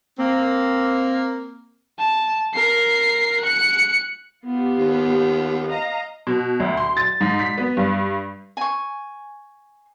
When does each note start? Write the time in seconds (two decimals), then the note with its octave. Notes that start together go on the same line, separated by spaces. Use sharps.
0.18 A#3 C4
1.98 A5
2.54 A#4 C7
3.40 F#6 C#7
4.45 B3 F4 G4
4.78 D#2
5.68 D#5 F5 A#5
6.27 B2
6.60 D2
6.77 C6
6.97 A6
7.21 G#2
7.39 B6
7.58 B3
7.77 G2
8.57 G#5 C#6